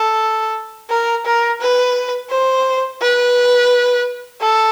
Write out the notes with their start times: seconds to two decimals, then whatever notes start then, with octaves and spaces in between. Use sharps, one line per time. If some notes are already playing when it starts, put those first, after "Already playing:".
Already playing: A4
0.90 A#4
1.26 A#4
1.61 B4
2.30 C5
3.01 B4
4.41 A4